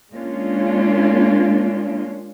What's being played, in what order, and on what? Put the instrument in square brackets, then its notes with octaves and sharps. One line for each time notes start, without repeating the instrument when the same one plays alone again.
[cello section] G#3 A#3 C#4 D4 F4